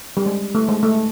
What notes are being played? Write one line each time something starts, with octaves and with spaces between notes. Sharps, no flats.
G3
G#3
A3
G#3
A3